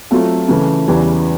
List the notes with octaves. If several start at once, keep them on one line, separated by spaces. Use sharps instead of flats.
F#3 A3 C4 F4
C#3 E3 A3
E2 C#3 E3 G3